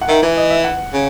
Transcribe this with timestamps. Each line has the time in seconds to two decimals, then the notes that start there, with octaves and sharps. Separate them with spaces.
0.01 F#5
0.08 D#3 E5
0.23 E3 E5
0.37 D#5
0.50 E5
0.64 F#5
0.93 C#3